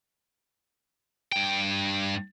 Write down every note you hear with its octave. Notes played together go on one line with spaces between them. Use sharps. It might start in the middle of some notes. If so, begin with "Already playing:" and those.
G2 G5